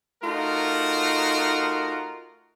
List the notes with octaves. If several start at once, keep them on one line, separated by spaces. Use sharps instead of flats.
A3 D#4 F4 F#4 A#4